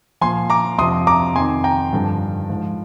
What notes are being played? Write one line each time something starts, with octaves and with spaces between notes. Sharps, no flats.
A#2 F3 G#5 C6
A#5 D6
F2 C3 F3 C6 D#6
A#5 D6
F2 D#3 G#5 C6
G5 A#5
G2 D3 F3
G#2 F3